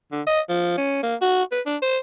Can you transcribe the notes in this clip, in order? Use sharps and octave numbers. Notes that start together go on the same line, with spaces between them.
D3
D#5
F3
C#4
A#3
F#4
B4
D4
C5